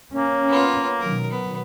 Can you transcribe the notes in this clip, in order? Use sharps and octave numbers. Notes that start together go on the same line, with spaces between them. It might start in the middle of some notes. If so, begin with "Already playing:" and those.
A#3 C#4
B3 F4
B2 D#3 F#3 A#4
B3